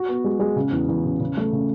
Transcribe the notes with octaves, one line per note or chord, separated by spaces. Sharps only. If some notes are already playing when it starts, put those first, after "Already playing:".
Already playing: F#4
B3
G#3
G#3
C#3
E2
E2
C#3
C#3
A3
C#3